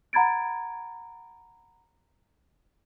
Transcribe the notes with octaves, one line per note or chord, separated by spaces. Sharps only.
F#5 A#5 B5 G#6 A6 D7